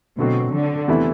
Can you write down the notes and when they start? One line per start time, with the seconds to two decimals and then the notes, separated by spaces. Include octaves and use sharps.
0.18 B2 D3 F#3 A3 C4 F#4
0.54 D3
0.88 E2 C3 E3 A3 E4